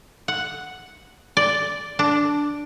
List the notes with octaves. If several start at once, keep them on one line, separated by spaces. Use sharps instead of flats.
F#5
D5
D4